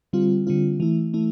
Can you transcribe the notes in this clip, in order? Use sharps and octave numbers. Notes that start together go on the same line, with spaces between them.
D3 G3 C4 F4
D3 G3 C4 F4
E3 A3 E4
E3 A3 E4